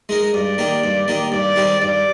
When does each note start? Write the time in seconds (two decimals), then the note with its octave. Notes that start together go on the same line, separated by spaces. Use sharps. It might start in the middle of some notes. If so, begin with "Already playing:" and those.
0.09 G#3 D#4 A#4
0.34 G2 D5
0.58 D#3 A#3 D#4 G4
0.84 G2
1.08 D#3 A#3 D#4 G4
1.32 G2 D5
1.56 D#3 G3 C4 D#4
1.81 G2 D5